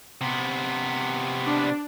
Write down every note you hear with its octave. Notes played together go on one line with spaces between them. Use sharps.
C3 B3
D4